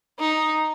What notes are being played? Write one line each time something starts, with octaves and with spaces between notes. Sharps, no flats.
D#4